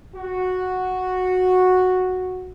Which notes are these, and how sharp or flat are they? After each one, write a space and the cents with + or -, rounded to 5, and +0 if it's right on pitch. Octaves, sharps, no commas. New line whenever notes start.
F#4 -5